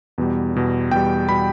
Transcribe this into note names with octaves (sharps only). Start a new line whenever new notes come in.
E2 B2 G3
E2 B2 G3
E2 B2 G3 G5
B2 G3 B5